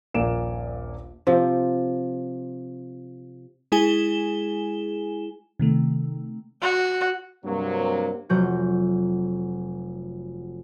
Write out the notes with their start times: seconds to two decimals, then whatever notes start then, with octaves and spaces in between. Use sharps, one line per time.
0.14 D#1 A#1 A#2 A#3 D7 E7
1.27 C3 F3
3.72 G#3 E4 G#4 G#5 E7 G7
5.59 C3 D#3 A3
6.61 F#4
7.45 G2 C3 F#3 A#3
8.29 F1 F#3 F#4 G6